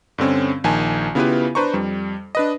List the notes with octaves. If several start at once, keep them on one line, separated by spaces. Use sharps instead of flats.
G2 D3 C4 C#4
A#1 D#3 G#5 A5
C#3 B3 E4 F4 G4 B4
D4 B4 C5 A#5 C#6
F2 G3
D4 B4 D#5